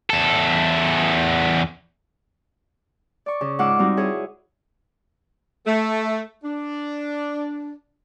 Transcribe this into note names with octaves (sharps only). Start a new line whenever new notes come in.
E2 A4
D5 C#6
C#3
G#2 F4 F#5 D6 E6
G3 C4 D#4 F#4
E4 G#4 C#5
A3
D4